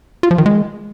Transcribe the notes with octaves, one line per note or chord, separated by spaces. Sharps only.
F4
F3
D#3
G#3